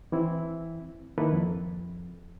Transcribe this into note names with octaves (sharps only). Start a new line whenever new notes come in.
E3 C4 E4
D#3 A#3 E4 A4 B4
F2